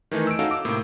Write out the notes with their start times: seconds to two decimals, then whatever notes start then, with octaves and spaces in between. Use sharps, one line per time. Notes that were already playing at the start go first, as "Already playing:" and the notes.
0.11 D#3 E3 A3 D#4
0.27 E6 D7
0.39 C#4 D#4 F#4 A4 F5
0.51 D6
0.65 A2 C3 A#3